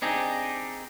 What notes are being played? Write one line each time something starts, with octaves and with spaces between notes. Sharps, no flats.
C4 D4 D#4 G4 G#4